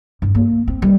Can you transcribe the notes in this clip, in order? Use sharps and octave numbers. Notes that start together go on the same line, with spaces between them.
G2
A#3
C4
G3